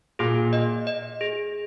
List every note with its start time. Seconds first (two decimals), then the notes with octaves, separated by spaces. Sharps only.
0.19 A#2 G#4
0.53 D#5
0.87 D#5
1.21 G#4